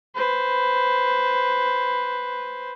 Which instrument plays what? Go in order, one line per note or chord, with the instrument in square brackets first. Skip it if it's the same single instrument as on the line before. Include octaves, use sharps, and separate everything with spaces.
[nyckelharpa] B4 C5